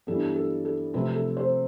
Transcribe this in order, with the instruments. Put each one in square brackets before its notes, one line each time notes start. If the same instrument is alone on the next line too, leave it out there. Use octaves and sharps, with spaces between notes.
[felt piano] G2 E3 G3 B3 A4
A4
A4
C3 F3 A3 C4 B4
A4
C5